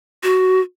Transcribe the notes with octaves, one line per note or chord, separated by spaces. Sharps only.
F#4